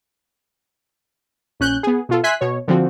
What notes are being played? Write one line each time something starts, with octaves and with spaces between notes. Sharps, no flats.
A#1 C#4 F#6 G6
B3 G#4
B2 F4 A4
E5 G#5 C6 F#6 B6
B2 C#5
D3 F3 C4 F#4